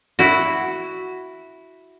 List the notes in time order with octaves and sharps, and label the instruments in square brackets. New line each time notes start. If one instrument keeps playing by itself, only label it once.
[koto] E4 F#4